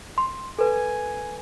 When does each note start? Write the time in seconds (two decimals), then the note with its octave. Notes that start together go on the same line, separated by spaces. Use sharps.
0.18 C6
0.59 A4 B4 G#5